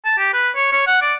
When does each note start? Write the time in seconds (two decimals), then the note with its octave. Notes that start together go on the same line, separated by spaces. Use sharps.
0.05 A5
0.18 G4
0.34 B4
0.56 C#5
0.72 C#5
0.87 F#5
1.02 D5